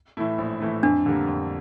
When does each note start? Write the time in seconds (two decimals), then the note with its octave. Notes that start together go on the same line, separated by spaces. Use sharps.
0.17 A2 E3 A3 E4
0.38 A#1
0.60 A2 E3 A3 E4
0.83 F2 D4
1.06 D3 G3 A#3
1.28 F2